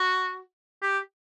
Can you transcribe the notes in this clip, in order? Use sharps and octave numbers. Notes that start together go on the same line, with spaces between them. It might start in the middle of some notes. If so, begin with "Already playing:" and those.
Already playing: F#4
G4